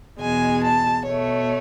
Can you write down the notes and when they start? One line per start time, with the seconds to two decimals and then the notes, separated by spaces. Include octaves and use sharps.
0.19 E2 B2 G#3 G#5
0.63 A5
1.06 B2 A3 C#5